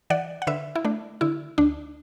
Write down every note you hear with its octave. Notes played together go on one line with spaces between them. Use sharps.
E3 D5 F#5
F#5
D3 B4 E5
E4
A3 D4
D3 E4
D2 D4